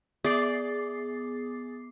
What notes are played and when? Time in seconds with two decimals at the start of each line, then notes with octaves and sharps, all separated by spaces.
0.24 B3 G#4 D5 D6 A6 C7